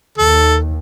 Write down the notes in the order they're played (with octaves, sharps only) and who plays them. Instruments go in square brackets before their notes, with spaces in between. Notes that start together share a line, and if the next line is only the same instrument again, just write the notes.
[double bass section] D#2 [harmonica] A4